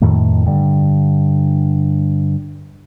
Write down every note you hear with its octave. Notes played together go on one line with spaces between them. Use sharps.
F2 A2 D#3 A3
G2 D3